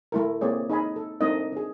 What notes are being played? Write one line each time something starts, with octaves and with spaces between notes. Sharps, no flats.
A3 E4 A#4
A#3 C4 G#4 C#5 D5
D#4 G#4 D#5 G#5 B5
A4
A3 C4 D4 D#4 A#4 D#5
D4 G#4